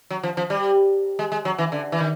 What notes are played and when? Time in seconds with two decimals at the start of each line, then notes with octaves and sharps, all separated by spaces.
0.10 F#3
0.23 F3
0.37 F3
0.50 G3
1.19 G#3
1.32 G#3
1.45 F#3
1.58 E3
1.72 D3
1.92 E3
2.00 D#3